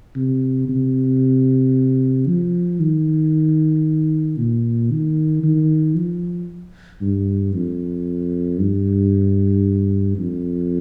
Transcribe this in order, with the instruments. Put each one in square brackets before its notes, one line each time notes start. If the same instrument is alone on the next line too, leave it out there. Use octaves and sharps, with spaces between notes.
[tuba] C3
C3
F3
D#3
A#2
D#3
D#3
F3
G2
F2
G2
F2